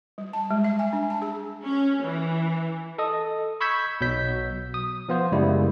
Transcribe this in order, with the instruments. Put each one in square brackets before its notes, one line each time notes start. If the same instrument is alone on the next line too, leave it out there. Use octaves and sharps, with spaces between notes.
[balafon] G3
A5
G#3
E5
G#5
D4
A5
G#4
[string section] C#4
E3
[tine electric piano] A4 D#5 D#6
B5 C#6 E6 G6 G#6 B6
B1 B2 F#3 G6 B6
D#6
F3 B3 F4 C5
F#2 C#3 G3 G#3 B3 E4